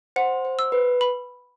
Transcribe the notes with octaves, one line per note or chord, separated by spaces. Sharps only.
C5 F#5
C5
E6
B4
B5